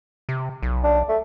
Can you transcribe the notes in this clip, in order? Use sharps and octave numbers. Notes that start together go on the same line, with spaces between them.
C3
B1
D4
A3